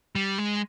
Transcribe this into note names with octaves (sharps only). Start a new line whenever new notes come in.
G3
G#3